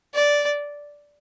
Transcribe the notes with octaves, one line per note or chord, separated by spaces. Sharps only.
D5